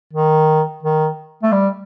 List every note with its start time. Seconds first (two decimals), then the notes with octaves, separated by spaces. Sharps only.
0.13 D#3
0.83 D#3
1.43 A3
1.52 G3